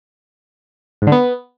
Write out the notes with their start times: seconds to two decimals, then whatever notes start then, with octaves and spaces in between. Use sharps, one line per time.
1.02 G#2
1.07 D3
1.12 B3